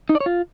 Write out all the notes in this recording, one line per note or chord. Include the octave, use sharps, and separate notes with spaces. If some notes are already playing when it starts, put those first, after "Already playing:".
D#4
D5
C#5
F4